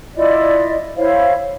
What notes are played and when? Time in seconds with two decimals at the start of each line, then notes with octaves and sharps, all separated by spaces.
0.15 E4 F4 D5 D#5
0.97 E4 C5 C#5 F5